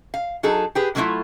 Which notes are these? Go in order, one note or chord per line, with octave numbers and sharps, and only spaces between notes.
F5
F#3 D#4 G#4 A4
G4 G#4 B4
D3 F#3 A3 C4 E4 F4